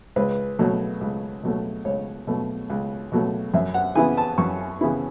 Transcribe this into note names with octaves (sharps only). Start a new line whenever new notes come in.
C#2 B4
B2 F#3 A3
C#2
B2 F#3 A3
C#2 C#5
B2 F#3 A3
C#2
B2 F#3 A3
F#2 E5
F#5
C#3 E3 B3 E4 G#5
A5
F#2 C#6
C#3 E3 B3 E4